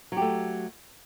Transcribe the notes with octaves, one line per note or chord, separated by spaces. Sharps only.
F#3 A3 G4